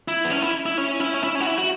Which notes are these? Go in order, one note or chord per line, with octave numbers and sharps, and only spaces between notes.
E4
B3
C#4
E4
E4
C#4
E4
C#4
E4
C#4
F#4
E4
F#4